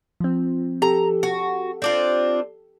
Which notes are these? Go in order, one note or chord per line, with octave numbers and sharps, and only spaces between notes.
F3 C4
G4 A4 A#5
F#4
C4 D4 F4